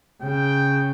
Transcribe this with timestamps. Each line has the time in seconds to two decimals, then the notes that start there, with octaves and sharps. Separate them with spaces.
0.22 C#3 G5